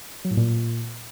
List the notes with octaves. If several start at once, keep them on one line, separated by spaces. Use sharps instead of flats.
F#3
A2
A#2